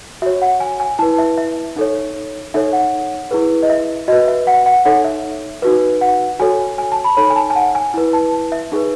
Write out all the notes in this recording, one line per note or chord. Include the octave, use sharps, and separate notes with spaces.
F#4 C#5 E5
F#5
G#5
G#5
E4 B4 A5
E5
E5
D#4 A4 C#5
D#4 A4 C#5 E5
F#5
E4 G#4 B4
D#5
E5
F#4 B4 D#5
E5
F#5
F#5
D#4 A4 C#5 F#5
E5
D#4 F#4 B4
F#5
F#4 A4 C#5 G#5
G#5
A5
B5
D#4 A4 C#5 B5
G#5
A5
G#5
F#5
G#5
E4 B4
A5
E5
D#4 G#4 B4